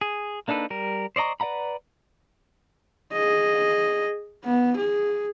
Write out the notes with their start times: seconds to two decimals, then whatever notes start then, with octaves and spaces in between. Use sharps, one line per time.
0.01 G#4
0.48 A#3 D4 D#4 A4 B4
0.70 G3 A#4
1.16 C5 D5 D#5 A#5 C#6
1.40 B4 D5 F#5 A#5 B5
3.13 G#4 D#5
4.45 B3
4.77 G#4